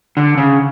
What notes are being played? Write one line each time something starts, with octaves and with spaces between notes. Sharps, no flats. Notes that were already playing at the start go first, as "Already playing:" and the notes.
D3
C#3